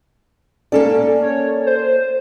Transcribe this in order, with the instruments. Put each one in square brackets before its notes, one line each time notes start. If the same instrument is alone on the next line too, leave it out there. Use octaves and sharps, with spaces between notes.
[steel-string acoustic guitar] A#3 A4 D5 [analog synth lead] C#4
[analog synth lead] C#5
C5